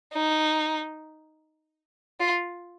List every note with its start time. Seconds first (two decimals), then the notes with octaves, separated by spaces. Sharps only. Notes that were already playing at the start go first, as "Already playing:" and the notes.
0.14 D#4
2.20 F4